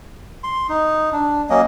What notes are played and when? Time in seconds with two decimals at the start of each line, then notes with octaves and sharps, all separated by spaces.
0.44 C6
0.69 D#4
1.13 D4
1.50 F#3 A#3 C#4 D#5